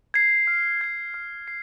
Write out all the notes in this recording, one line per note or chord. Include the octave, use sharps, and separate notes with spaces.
G#6 C7
F6
G#6 C7
F6
C7